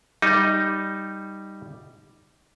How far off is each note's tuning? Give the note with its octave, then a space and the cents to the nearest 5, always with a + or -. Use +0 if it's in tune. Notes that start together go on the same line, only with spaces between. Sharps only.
G3 +0 D#4 +0